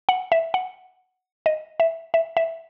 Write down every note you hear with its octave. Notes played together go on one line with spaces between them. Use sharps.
F#5
E5
F#5
D#5
E5
E5
E5